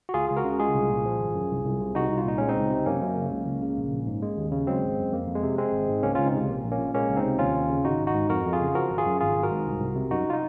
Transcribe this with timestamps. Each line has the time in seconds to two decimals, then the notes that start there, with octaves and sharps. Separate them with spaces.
0.09 F#4
0.14 C#2 F4 G#4
0.29 C#2 G#4
0.37 F#4 A#4
0.44 C#3
0.59 G#3 F4 G#4
0.75 C2
0.90 A#2
1.05 F3
1.20 G#1
1.35 F#2
1.51 C2
1.65 C2
1.81 C3
1.95 C2 D#4 F#4
2.10 C2
2.18 F4
2.26 A#2 D#4
2.38 G#3 C#4
2.49 C4 D#4
2.56 C#2
2.71 C3
2.86 F#2 A#3 C#4
3.02 F#2
3.16 C#3
3.32 C#2
3.46 C#2
3.62 C#3
3.77 A#1
3.92 A#1
4.07 G#2
4.22 G#3
4.37 D#2
4.52 C#3
4.67 F#3 G#3 C4
4.83 G#1
4.98 F#2
5.12 F2 A#3
5.27 F2
5.35 G#3
5.43 C3
5.58 G#3 C4
5.73 G#1
5.89 G#2
6.03 C#2 A#3 C#4
6.15 C#2 C#4 F4
6.26 C4 D#4
6.33 C3 G#3
6.48 A#1 A#3
6.63 A#1
6.72 A#3 C#4
6.79 A#2
6.94 G#3 A#3 C#4
7.09 C#2
7.17 C4 D#4
7.24 C3
7.39 D#2 C#4 F4
7.54 D#2
7.69 C#3
7.85 G#1 D#4 F#4
8.00 G#1
8.07 D#4 F#4
8.14 G#2
8.30 F2 F#4 A#4
8.45 F2
8.53 F4 G#4
8.60 C#3
8.75 F3 F#4 A#4
8.91 G#1
8.98 F4 G#4
9.06 F#2
9.20 G#1 F4 G#4
9.35 G#1
9.43 F#4 A#4
9.51 G#2
9.66 C2
9.81 C2
9.96 C3
10.11 F#2 D#4 F#4
10.30 F4
10.33 D#4